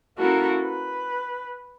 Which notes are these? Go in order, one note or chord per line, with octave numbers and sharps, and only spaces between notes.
A#3 C#4 E4 F#4 A4 A#4
B4